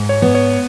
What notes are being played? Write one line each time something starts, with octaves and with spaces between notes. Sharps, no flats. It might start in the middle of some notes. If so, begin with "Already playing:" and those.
Already playing: G#2
C#5
B3
C#5